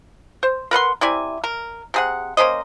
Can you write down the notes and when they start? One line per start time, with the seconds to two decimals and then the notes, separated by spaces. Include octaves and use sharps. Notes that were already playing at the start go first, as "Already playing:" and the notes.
0.43 C5
0.71 A#4 B4 F#5 C6
1.01 C3 E4 D5 G#5
1.44 A#4
1.94 C3 G#4 F#5
2.37 A#3 C#4 C5 D#5